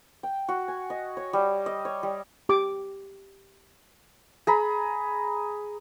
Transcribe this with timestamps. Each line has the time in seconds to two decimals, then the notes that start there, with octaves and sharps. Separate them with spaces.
0.23 G5
0.48 F#4
0.68 G#5
0.90 D#5
1.17 C#5
1.33 G3
1.66 D#5
1.85 C#5
2.03 G3
2.49 G4 D6
4.47 G#4 A#5 B5